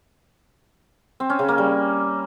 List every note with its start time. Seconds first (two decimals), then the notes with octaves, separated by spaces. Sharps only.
1.20 C4
1.30 C#4
1.39 C#3
1.48 A#3
1.58 G3